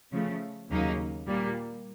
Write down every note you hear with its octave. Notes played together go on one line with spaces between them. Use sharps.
C#3 F3 A3
D#2 C#3 F#3 A#3 D#4
A#2 G3 A#3